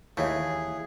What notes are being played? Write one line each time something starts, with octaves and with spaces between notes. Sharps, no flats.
D#2 E3 A3 G#4 C#5 F5